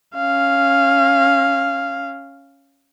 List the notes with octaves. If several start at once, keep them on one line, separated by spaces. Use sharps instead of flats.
C#4 F5